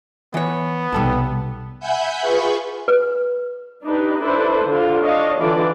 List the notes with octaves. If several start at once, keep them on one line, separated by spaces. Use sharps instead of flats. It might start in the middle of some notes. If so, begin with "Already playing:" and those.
E3 B3 C#5
B1 C3 G3 A4 A5
E5 F#5 G#5 B5 G6
F4 G#4 B4 C#6
B4
D4 D#4 G4 B4
D4 E4 A4 B4 C5
D3 F4
D4 C#5 D#5 F5
D3 E3 D4 F4 D5